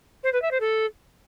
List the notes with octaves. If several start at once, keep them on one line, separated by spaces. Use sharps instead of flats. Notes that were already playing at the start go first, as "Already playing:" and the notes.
C5
B4
E5
C5
A4